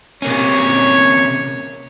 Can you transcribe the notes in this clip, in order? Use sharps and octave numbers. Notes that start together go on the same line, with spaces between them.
C3 A#3 C#4 C#5